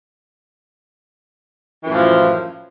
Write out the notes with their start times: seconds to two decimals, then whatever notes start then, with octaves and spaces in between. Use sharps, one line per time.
1.83 E3
1.86 F#2
1.89 A2
1.92 F3